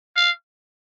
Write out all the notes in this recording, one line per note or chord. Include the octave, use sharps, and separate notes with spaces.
F5